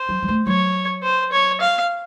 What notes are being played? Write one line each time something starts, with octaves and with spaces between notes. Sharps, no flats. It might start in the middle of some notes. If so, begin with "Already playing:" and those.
Already playing: C5
F#3
F#3
A3
F#3 C#5
C5
C#5
F5